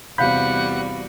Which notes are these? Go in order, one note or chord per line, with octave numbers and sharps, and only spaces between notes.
E2 C3 G3 F#4 F5 F#5 B5 G6